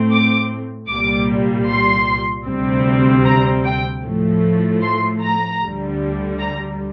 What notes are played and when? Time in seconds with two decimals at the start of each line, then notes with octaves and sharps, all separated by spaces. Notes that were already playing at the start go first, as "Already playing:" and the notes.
Already playing: A2 A3 C4
0.11 D6
0.89 C2 A#2 G3 D6
1.68 C6
2.46 D2 C3 G3 C4
3.25 A#5
3.64 G5
4.03 A2 F3 A3
4.82 C6
5.21 A#5
5.61 D2 D3 G3
6.39 A#5